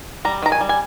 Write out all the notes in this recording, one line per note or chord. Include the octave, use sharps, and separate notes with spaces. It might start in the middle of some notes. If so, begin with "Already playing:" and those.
G3 A#5
D#3 A#5
G#5
G3
G#5